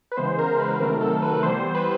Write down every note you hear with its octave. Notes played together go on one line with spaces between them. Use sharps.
B4
C#3 E3 G#3 B3 C5
A#4
B4
C3 D#3 F#3 A3 C4 A#4
A4
B4
B4
E3 G3 B3 C5
C5
B4